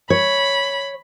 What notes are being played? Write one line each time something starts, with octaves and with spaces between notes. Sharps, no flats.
C#5 B5